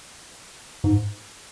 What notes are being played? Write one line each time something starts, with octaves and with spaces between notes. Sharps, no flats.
G#2